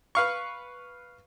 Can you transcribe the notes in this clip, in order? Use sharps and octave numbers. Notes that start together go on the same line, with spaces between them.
B4 F5 C#6